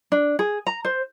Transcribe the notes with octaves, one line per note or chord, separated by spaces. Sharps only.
D4
G#4
A#5
C5